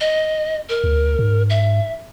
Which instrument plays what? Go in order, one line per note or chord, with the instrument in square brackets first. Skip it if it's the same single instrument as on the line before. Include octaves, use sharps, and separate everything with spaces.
[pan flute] D#5
A#4
[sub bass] D2
G#2
[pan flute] E5